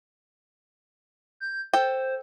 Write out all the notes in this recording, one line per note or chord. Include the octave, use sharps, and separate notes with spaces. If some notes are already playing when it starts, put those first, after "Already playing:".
G6
A4 C5 G5